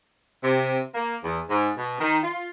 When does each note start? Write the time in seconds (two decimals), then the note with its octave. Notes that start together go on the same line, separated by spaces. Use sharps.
0.43 C3
0.95 A#3
1.24 E2
1.48 G#2
1.76 B2
2.00 D#3
2.23 F4